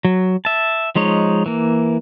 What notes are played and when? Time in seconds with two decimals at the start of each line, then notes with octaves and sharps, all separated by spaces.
0.05 F#3
0.45 E5 A5
0.95 F3 G#3 D#4 C#5
1.46 E3 A#3